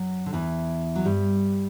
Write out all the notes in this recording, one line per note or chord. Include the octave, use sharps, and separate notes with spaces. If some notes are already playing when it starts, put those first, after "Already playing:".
Already playing: F#2 F#3
D3
E2 E3
F#3
G2 G3